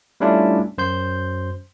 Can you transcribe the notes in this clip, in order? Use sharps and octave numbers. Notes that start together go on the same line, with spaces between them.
G3 A3 C#4 D4 E4 F4
F#2 C5 C6 G6